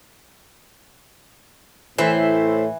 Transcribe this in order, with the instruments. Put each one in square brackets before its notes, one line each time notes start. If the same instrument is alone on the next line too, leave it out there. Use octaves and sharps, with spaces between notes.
[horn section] A2 [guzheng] E3 [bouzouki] C5 E5